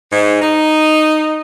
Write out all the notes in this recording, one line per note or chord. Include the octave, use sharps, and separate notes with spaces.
G#2
D#4